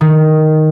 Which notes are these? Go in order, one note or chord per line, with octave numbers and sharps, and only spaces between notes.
D#3